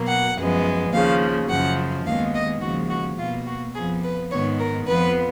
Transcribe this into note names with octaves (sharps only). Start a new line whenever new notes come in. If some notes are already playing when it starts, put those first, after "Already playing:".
Already playing: B2 F#3 A#3
F#5
F#2 F3 G#3 B3
D#2 C#3 F3 F5
F#2 C#3 F3 F#5
D#2 D#3 G#3 B3 F5
D#5
D#2 C#3 F3 G#3 F#4
F#4
B2 A#3 F4
F#4
F2 F3 B3 G#4
B4
G#2 D#3 G#3 B3 C#5
A#4
F2 F3 B3 B4